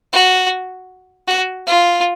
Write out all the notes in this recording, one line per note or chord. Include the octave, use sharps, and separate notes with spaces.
F#4
F#4
F4